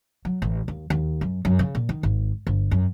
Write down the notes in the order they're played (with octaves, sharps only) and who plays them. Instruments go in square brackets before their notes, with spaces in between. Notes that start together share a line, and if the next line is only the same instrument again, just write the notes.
[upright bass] F#3
A1
D#2
D#2
F#2
F#2
C#3
A#2
D#3
G#1
G1
F#2